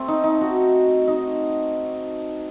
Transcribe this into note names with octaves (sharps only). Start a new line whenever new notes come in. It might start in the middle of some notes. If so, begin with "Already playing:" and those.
Already playing: A3 C4
D#4
D#4
F#4
D#4